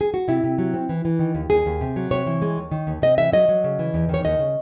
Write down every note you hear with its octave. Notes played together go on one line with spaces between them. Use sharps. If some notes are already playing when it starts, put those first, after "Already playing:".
G#4
F#4
C3 E4
C3
F#3
C4
E3
E3
D#3
D#2
D#2 G#4
D#2
C3
F#3
C3 C#5
E3
G#3
D#2
D#3
D#2
C3 D#5
E3 E5
F#3 D#5
F#3
C#3
E3
E2
D#3 C#5
D#2 D#5
C#3